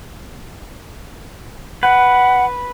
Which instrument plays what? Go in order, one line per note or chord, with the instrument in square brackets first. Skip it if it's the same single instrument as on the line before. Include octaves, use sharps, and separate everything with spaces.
[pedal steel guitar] B4 [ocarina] F#5